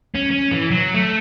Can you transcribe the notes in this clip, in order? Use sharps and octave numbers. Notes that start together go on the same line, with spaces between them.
C#4
C#4
E3
F#3
A3